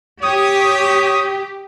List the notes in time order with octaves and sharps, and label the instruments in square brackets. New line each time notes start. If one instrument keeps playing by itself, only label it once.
[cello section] G4 [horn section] C#5 [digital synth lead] D#6